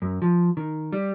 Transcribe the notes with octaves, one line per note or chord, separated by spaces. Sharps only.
F#2
F3
D#3
G3